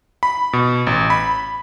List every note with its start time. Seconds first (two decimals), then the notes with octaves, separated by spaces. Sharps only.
0.23 B5
0.53 B2
0.87 A1
1.10 B5